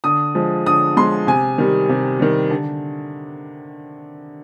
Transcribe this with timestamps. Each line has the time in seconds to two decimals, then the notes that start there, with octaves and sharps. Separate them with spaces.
0.04 D3 D#6
0.35 F3 G#3
0.66 D3 D#6
0.97 F3 G#3 C6
1.27 C3 G#5
1.58 D#3 G3
1.89 C3
2.19 D#3 G3
2.50 D3